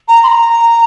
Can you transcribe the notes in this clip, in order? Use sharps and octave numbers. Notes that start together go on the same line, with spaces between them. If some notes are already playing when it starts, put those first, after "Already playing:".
A#5
C6
A#5